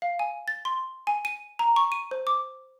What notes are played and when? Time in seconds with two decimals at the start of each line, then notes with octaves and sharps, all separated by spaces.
0.02 F5
0.19 G#5
0.48 A6
0.65 C6
1.07 G#5
1.25 D#7
1.59 A#5
1.76 C#6
1.92 D#7
2.11 C5
2.27 D6